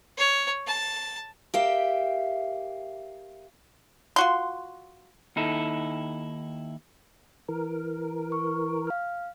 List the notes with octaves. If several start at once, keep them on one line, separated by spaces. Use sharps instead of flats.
C#5
A5
G4 A#4 E5 F5 G5
F4 F#4 C6
D#2 D#4 E4 A4
E3 A#4
C#6
F5 F6